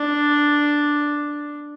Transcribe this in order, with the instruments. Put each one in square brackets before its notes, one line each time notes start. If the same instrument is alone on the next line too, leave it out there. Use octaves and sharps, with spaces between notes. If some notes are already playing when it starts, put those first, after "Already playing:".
Already playing: [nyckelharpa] D4